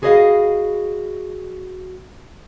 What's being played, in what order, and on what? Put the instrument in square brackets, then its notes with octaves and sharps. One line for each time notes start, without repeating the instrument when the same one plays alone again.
[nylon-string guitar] F#4 G#4 B4 C5 D#5 F5